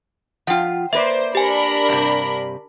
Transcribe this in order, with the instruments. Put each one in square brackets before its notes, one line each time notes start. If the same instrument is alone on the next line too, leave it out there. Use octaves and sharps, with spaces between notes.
[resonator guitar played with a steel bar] F3 F4 [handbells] F#5 G5
[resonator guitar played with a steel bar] A#3 B4 D5 [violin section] C5 [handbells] E5
[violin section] D4 A#4 B5 [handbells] G4 G#5
[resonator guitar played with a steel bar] G2 C3